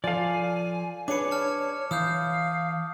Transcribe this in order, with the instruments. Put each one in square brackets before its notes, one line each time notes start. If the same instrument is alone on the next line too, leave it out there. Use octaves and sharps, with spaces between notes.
[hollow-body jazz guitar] F3 A4 [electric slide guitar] D5 F5 [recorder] G#5
[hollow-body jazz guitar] D4 G#4 B4 [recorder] C#5 [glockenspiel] D6 C#7
[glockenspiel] A5 F6
[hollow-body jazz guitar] E3 [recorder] F5 [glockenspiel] D#6 F6 G6